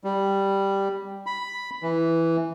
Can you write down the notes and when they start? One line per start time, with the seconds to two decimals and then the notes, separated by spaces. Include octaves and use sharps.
0.04 G3
1.26 B5
1.83 E3